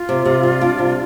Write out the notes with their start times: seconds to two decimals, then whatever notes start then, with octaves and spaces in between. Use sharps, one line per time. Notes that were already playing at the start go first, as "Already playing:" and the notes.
Already playing: F4
0.09 C3
0.25 C3
0.43 G3
0.61 D4
0.79 C3